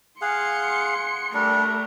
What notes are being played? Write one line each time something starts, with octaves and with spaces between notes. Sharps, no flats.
G#4 F5 F#5 C6 C#7
G3 A3 D4 A#4